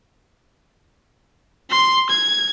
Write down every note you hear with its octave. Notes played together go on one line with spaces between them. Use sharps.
C6
G#6